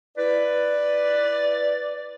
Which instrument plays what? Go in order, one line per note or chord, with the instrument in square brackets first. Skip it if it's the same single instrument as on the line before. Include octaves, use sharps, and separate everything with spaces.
[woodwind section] E4 B4 [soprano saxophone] D5